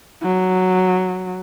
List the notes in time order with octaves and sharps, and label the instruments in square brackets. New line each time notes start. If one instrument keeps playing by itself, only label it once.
[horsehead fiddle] F#3